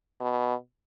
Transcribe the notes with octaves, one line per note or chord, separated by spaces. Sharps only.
B2